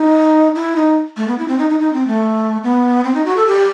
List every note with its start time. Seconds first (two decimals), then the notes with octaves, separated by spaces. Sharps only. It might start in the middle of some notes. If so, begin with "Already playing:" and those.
Already playing: D#4
0.55 E4
0.76 D#4
1.17 A3
1.28 B3
1.39 E4
1.48 C4
1.59 D#4
1.70 D#4
1.80 D#4
1.93 C4
2.08 A3
2.63 B3
3.04 C4
3.15 D#4
3.26 F#4
3.36 A4
3.47 G4